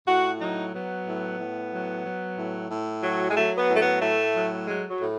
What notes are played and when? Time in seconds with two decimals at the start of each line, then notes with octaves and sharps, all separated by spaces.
0.07 A2 F#4
0.41 F#3 D#4
0.73 F#3 B3
1.07 A2
1.40 A2
1.72 F#3
2.04 F#3
2.38 A2
2.70 A2
3.03 F#3
3.29 G#3
3.36 F#3 A3
3.58 B3
3.69 A2
3.75 A3
3.80 B3
4.01 A2 A3
4.35 F#3
4.67 F#3 G#3
4.90 F#3
5.00 A2